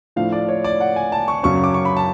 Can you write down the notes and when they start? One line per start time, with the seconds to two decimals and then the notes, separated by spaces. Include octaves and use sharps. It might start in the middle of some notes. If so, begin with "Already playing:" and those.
0.16 A2 F3 A3 D4 F5
0.33 D5
0.49 C#5
0.64 D5
0.80 F#5
0.96 G#5
1.12 A5
1.28 C#6
1.43 F#2 C#3 F#3 C#4 C#6
1.64 D6
1.74 C#6
1.85 B5
1.97 A5